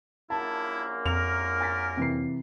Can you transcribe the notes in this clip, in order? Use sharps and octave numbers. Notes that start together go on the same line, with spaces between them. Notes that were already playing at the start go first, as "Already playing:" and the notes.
A#1 F#2 A#3 E4 A5
F2 A#4 F7
G#5 A6 B6
C3 E3 C7